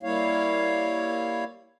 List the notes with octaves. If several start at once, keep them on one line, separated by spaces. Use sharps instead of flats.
G3 A#3 E4 C#5 F5